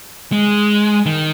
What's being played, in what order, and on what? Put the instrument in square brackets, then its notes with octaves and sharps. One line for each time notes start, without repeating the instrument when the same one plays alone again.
[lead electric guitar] G#3
D#3